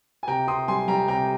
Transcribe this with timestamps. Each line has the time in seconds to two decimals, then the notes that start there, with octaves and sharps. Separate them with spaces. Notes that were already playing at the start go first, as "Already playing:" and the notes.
0.23 G#5
0.28 C3 G5 A#5
0.47 C3 C6 D#6
0.68 G3 G#5 C6
0.88 G3 G5 A#5
1.08 C3 G5 A#5